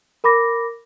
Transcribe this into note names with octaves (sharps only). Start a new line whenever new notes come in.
A#4 B5 D6 A#6